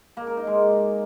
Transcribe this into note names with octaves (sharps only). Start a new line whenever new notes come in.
A#3
A#4
D#4
G#3